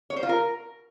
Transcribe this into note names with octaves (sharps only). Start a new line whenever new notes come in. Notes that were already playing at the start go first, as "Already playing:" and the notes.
C#5
C5
F4
A#4